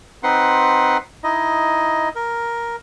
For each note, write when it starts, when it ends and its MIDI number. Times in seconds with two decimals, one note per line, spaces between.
0.23 0.97 60
0.23 0.97 63
0.23 0.97 71
0.23 0.97 78
0.23 0.97 84
1.24 2.09 63
1.24 2.09 64
1.24 2.09 75
2.15 2.76 70